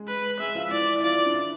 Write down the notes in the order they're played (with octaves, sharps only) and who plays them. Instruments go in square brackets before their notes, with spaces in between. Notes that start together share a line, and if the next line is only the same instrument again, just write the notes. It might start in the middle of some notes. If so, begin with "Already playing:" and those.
Already playing: [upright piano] G#3 G#4
[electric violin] B4
[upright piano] G#3 G#4 [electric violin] E5
[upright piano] F3 F4
[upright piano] E3 E4 [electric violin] D5
[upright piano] E4
[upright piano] F3 F4 [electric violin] D5
[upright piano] D4
E3 E4